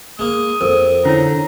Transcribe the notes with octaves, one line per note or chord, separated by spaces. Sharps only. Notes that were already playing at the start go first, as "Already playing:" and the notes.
G#3 A#3 D#6
F2 A4 A#4
D3 C#4 E4 C#5 A#5